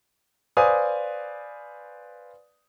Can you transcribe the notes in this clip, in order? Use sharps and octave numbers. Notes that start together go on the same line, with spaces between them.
B4 C5 D5 F5 G#5 D#6